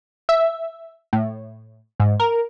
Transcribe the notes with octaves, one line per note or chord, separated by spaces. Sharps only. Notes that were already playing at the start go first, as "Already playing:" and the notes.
E5
A2
G#2
A#4